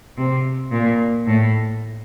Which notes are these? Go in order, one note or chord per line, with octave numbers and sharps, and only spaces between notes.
C3
A#2
A2